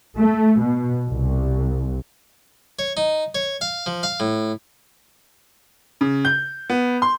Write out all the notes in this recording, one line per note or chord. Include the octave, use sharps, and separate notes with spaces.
A3
B2
C2
C#5
D#4
C#5
F5
F3
F5
A2
C#3
G6
B3
C6